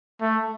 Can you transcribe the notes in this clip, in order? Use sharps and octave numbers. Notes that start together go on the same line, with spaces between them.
A3